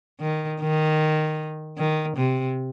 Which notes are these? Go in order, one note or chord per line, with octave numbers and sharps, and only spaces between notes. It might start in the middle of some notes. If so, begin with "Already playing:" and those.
D#3
D#3
D#3
C3